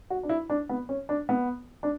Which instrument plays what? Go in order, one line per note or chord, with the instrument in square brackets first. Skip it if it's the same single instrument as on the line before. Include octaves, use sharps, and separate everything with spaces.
[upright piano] F#4
D4
E4
D4
B3
C#4
D4
B3
D4